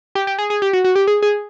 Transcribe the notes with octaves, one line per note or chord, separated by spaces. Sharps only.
G4
G4
G#4
G#4
G4
F#4
F#4
G4
G#4
G#4